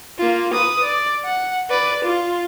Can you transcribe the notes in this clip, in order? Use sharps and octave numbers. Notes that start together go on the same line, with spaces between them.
A#3 F4
B4 D#6
D5
F#5
B4 D5
F4